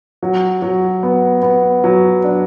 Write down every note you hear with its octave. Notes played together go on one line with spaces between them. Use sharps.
F#3
F#3
B3
B3
F#3
D4